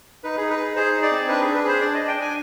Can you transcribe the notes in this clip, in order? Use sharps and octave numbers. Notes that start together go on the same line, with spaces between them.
D#4 B4
D#4 G#4
B4
G#4
G#4 C5
D#4
D5
C4
D4 B4
D4 G#4
B4
G#4 C5
D4 D5
D4 D#5
G5
D4
G#5